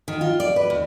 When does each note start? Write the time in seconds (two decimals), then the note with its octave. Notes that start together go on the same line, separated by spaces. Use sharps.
0.08 D#3
0.21 F4
0.40 D5
0.56 B4
0.70 D#2